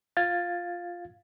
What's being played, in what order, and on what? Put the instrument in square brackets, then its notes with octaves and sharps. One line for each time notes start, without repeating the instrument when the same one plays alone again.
[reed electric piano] F4 F5 G#6 A6